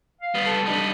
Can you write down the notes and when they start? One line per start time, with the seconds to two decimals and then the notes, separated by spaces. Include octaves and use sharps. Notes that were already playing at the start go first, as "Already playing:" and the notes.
0.21 F5
0.35 G3 B3
0.46 A4
0.66 G3 D4 D#4